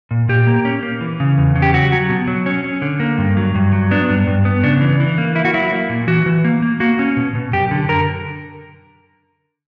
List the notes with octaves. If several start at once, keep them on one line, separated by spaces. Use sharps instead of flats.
A#2
A#2 G4
A#3
C#4
A#3
E3
C#3
E2
C#3
G4
F#3 F#4
F#3
B2
F#3
C#4
C#4
D3
A#3
G2
F#3
G2
F#3
B3 D4
G2
G2
B3
C#3 D4
E3
E3
A#3
A#3 E4
F#4
F#3 E4
A#3
A#2
E3 F#4
E3
A#3
A#3
A#3 F#4
C#4
B2
B2
F#2 G4
D3
D3 A#4